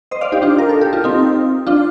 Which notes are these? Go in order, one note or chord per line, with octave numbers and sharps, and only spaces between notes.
C5 D#5
D5 F5
D#4 G4
D4 F4
A#4
A4
G4
F4
C4 D#4
D4 F4